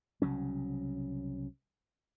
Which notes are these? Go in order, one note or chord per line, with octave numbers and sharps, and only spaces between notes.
C2 C#3 F#3 C#4